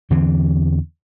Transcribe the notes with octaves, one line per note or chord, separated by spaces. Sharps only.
E2 D3 E3 C4